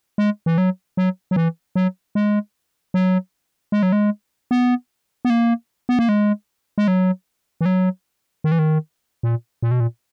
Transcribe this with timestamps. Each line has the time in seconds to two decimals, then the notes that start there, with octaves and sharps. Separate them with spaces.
0.18 G#3
0.46 E3
0.58 F#3
0.97 F#3
1.31 F#3
1.36 E3
1.76 F#3
2.15 G#3
2.94 F#3
3.72 G#3
3.83 F#3
3.92 G#3
4.51 B3
5.25 B3
5.30 A#3
5.89 B3
5.99 A#3
6.09 G#3
6.78 G#3
6.88 F#3
7.61 E3
7.66 F#3
8.44 D#3
8.52 E3
8.59 D#3
9.23 A#2
9.63 A#2
9.71 B2
9.80 A#2